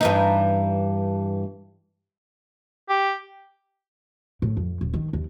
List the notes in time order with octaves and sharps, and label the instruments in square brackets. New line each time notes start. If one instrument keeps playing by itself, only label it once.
[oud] G2 E3 D#4
[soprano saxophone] G4
[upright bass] A2
F2
D#1
D#3
D#2